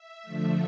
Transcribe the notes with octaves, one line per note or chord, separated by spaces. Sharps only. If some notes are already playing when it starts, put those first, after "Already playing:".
Already playing: E5
D3 F3 A3